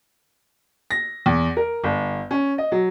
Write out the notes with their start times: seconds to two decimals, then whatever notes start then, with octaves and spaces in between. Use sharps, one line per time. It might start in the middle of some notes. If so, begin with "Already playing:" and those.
0.91 A#6
1.26 E2
1.57 A#4
1.84 G1
2.31 C#4
2.58 D#5
2.72 F#3